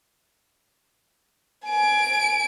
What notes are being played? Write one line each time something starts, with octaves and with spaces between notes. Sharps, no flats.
G#5 D7